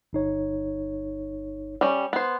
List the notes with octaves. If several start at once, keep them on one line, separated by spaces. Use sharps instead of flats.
G1 D#4 C#5
G3 C#4
B3 C5